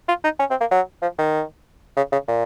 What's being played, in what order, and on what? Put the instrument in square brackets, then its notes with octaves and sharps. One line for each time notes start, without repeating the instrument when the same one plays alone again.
[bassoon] F4
D#4
C#4
C4
A#3
F#3
F3
D#3
C#3
C#3
A#2